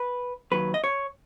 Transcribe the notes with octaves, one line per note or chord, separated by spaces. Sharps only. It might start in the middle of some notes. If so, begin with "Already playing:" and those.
Already playing: B4
D#2 D#3 F#3 B4
D#5
C#5